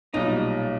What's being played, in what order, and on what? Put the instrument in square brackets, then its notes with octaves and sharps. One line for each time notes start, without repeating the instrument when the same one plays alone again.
[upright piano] B1 A#2 G3 [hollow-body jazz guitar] D#4